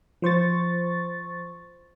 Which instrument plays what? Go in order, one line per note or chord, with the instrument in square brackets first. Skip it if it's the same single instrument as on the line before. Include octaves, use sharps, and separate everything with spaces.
[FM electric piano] F3 C5 C#6 A6